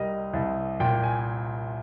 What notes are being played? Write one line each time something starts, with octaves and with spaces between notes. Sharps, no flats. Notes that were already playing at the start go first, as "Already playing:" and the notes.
Already playing: C2 G3 A#4 D#5
C2
A#2 G5
G#5